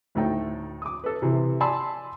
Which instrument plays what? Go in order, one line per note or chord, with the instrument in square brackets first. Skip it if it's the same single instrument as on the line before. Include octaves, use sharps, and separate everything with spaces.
[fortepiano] D2 A2 A3 D#4 G5
D6 D#6
A4 B4
C3 E3
D5 G#5 A5 B5 C6 E6